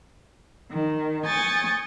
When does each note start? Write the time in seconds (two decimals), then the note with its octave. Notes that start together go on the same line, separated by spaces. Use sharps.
0.70 D#3
1.26 G#5 C#6 D#6 G6 A6